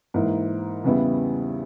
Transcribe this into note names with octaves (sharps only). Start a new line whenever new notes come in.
G#2 E3 A#3 E4 A#4
E2 C#3 G3 B3 E4